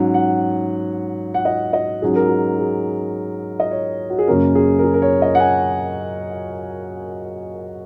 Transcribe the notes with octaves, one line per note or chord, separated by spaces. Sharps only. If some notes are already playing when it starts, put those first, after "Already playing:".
Already playing: G#2 F#3 C#4
F#5
F#5
D#5
D#5
G#2 F#3 C#4 G#4
A#4
G#4
G#4
D#5
C#5
F#4
G#4
F#2 C#3 A#3 C#4 A#4
G#4
A#4
G#4
A#4
C#5
D#5
F#5
G#5